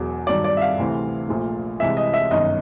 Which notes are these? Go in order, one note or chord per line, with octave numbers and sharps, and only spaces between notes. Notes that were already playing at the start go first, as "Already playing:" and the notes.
Already playing: E1 E2 B2 F#3
G2 D#3 F#3 D5
D5
E5
F5
D2 C3 E3 A3 C4
A#1 A#2 F3 A3
C2 C3 E3 G#3 E5
D#5
E5
G1 F#2 D#3 D#5